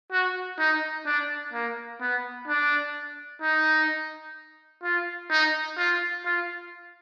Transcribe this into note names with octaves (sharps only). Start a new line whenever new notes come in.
F#4
D#4
D4
A#3
B3
D4
D#4
F4
D#4
F4
F4